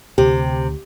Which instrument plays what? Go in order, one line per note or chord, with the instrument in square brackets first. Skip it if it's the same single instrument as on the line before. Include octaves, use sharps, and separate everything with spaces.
[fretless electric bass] D2 [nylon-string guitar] C3 [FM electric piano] G4